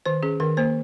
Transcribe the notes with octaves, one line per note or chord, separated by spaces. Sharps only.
D#3 C5
C#4 G#4
D#3 A#4
A#3 C5